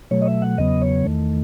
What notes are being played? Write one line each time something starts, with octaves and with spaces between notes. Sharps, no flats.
B2 F#3 A3 C#5
D#5
E5
F#5
E2 C#3 F#3 B3 D#5
C#5
E2 D#3 A3